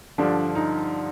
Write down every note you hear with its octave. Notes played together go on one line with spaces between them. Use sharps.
G2 D3 F3 D4
D#4